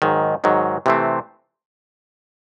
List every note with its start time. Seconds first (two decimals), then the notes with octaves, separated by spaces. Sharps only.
0.02 G#2 D#3 F#3
0.44 G#2 D#3 F#3
0.86 C3 E3 A3 C4